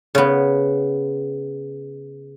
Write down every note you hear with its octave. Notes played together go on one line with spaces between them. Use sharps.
C#3 B3